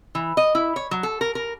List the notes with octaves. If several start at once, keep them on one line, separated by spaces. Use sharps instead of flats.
E3
D#5
E4
C#5
F#3
A4
A#4
A#4